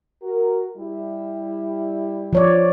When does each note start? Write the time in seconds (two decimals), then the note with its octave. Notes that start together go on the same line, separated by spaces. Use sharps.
0.23 F#4 A#4
0.77 G3 E4
2.33 F3 C#5 D5